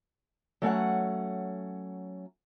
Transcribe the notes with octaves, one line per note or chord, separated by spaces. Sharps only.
F#3 A3 C#4 F#5